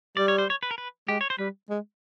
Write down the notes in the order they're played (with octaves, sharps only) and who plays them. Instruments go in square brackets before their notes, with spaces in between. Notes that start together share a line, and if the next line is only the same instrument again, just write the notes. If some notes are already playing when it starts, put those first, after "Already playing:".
[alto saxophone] G3 [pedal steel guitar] D5
[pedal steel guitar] C#5
C5
C#5
B4
A#4
B4
[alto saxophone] G#3 [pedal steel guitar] G4
[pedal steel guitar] C#5
C5
[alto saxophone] G3 [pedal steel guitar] B4
[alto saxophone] G#3